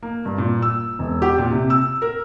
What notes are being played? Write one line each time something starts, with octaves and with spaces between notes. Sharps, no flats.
A#3
G2
A#2
E6
E1
G4
A#2
C3
E6
A#4